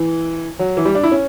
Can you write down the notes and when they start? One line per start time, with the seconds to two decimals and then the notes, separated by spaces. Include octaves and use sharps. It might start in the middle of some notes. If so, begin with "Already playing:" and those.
Already playing: E3
0.59 F#3
0.77 E3
0.85 G3
0.95 D4
1.03 E4
1.12 C#4